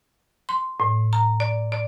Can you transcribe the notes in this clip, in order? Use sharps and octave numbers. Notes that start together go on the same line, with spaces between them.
C6
A2
A#5
D5
D5